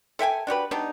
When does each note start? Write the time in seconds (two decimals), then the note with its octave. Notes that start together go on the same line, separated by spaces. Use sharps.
0.19 A4 E5 G5 G#5
0.47 D4 F#4 G4 B4
0.71 G3 B3 D4 D#4